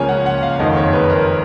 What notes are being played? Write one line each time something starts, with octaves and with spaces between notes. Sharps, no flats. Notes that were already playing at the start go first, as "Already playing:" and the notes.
Already playing: C#2 C#3 F3 A#3 C#4 C#5 G#5
F#5
F#5
F5
F#1 F2 D#3 D#5
C#5
B4
A#4